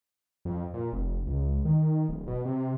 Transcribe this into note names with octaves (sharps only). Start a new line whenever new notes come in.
F2
A#2
F1
C#2
D#3
D1
B2
C3